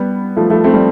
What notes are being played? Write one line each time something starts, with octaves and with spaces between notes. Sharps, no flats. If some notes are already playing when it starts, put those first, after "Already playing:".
Already playing: G3 B3
F3 A3
F3 A3
A3 C4
G3